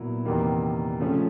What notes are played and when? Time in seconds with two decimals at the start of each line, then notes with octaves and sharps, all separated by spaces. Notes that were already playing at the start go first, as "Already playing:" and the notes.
Already playing: A#2 F#3 B3 E4
0.25 E2 C3 D#3 G3 A#3
1.00 C#3 F3 A3 C#4 F4